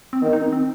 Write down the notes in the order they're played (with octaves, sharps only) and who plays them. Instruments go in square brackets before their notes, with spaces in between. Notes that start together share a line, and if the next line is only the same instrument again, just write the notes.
[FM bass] C4
[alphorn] D#3 [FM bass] B3
[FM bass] D#4
C4
C4